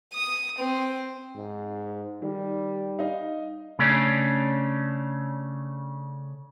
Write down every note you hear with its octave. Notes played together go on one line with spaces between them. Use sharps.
D#6
C4
G#2
D#3 G3
D#4 D#5 F5
C#3 A3 C#4 D4